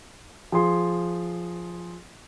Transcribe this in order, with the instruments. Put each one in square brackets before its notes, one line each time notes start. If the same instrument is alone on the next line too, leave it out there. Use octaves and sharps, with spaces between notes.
[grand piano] F3 G#4 C6